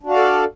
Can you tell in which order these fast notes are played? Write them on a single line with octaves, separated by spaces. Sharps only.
D4 F#4 F5 D5 A4